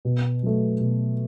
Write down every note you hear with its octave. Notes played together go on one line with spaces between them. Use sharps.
B2
F#3 A3
B2